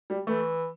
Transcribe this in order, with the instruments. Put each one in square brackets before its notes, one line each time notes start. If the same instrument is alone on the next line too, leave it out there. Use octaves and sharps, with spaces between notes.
[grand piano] G3
[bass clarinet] E3 [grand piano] A3